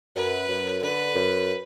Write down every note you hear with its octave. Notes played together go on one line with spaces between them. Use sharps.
F#2 B4
F#2
D3 B4
F#2